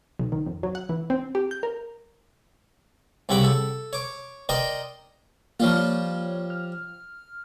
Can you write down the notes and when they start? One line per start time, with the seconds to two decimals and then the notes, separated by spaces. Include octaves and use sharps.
0.20 B1
0.32 D#3
0.46 F2
0.63 F#3
0.75 F#5
0.89 E3
1.10 C4
1.35 G4
1.51 G6
1.63 A#4
3.29 C2 C#3 C4 F#5 B5 D6
3.44 A4
3.93 C#5 D6
4.49 A#4 C5 D5 D#5 G5
5.60 F3 G3 A#3 F4 C#5
6.50 F6